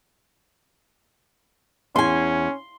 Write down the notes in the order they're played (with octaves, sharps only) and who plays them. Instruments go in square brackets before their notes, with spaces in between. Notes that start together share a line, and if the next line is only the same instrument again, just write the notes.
[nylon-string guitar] E2 G#5 [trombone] C#4 [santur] C6